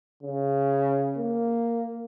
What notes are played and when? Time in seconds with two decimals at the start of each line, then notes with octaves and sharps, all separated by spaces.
0.23 C#3
1.17 A#3